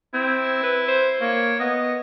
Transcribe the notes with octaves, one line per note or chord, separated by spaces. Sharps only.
C4 E4
B4
C5
A#3 C#5
B3 D#5